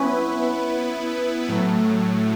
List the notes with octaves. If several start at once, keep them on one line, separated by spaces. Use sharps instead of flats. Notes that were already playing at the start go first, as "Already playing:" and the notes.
Already playing: B3 C#4 E4 B4
A2 F#3 A3